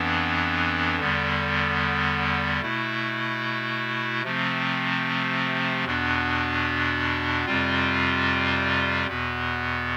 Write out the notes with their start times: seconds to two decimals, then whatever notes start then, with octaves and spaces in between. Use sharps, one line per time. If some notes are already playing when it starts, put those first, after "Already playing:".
Already playing: F2 E3 B3 D4
0.99 E2 D3 G3 B3
2.62 B2 A3 E4
4.23 C3 F3 A3 C4
5.84 E2 B2 B3 D4
7.45 F2 C3 G3 C4 F4
9.06 E2 B2 B3